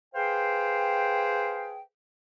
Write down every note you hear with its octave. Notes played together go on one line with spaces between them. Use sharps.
G#4 B4 C5 F5 G5